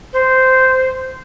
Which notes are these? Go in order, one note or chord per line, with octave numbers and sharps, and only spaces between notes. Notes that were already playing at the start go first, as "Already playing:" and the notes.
C5